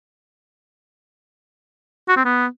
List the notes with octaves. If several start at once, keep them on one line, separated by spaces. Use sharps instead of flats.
F#4
C4
B3